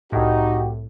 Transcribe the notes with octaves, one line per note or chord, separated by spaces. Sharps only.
C2 A2 D#4 F#4 G4